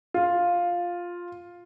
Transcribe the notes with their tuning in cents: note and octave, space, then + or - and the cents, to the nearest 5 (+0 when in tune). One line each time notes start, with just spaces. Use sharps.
F4 +5